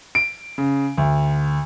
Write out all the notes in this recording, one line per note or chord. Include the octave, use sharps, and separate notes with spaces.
D7
C#3
D2